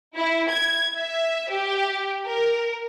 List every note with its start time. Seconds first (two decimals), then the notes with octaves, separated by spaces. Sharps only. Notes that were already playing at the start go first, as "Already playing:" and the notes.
0.15 E4
0.49 G#6
0.97 E5
1.50 G4
2.27 A#4